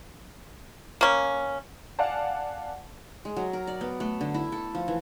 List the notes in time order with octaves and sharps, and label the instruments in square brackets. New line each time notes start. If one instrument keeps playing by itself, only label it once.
[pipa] A#3 C#4
[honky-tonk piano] D5 F5 F#5 G#5 A5
[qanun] G#3
F#3
A#4
D5
B3
A3
D3
E4
A4
F3
E3